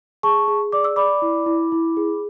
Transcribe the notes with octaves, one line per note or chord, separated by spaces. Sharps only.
G#4 A5 C#6
G#4
D5 D6
E6
D5 B5 D6
E4
E4
E4
G#4